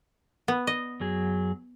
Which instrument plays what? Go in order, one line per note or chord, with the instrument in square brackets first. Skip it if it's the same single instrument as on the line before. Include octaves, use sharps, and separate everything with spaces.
[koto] B3
D#5
[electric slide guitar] F#2 F#3 G#4